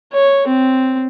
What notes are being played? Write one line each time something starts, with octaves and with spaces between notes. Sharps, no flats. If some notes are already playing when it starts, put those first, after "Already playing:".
C#5
C4